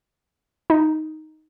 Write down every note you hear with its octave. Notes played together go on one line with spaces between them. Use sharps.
D#4